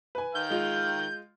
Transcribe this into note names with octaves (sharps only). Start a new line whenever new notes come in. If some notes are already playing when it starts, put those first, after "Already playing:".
B4 G#5
D#3 F5 G6
G#3 F4